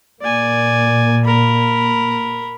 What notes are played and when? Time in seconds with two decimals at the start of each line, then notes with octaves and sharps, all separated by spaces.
0.21 A#2 A#3 D5 G#5
1.25 A#4 B5